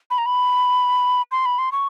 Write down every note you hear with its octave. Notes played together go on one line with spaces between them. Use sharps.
B5
A#5
B5
C6
B5
C6
C#6